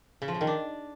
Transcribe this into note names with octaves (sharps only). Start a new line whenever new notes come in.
C#3
F3
C#3
D#3
D4